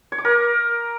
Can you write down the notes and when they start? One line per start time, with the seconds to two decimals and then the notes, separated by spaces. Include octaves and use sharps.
0.12 C#5
0.18 D6
0.25 A#4